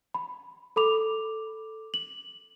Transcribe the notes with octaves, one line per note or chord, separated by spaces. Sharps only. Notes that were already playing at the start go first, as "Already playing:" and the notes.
B5
A4 B5 D6 F7
F#7